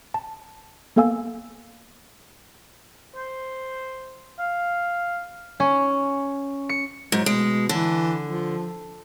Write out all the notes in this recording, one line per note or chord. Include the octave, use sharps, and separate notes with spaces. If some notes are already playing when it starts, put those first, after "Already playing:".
A5
A#3 B3 A4 F5 G#5 E6
C5
F5
C#4
C#7
G#2 F#3
B2 G#3
D3 E3
F3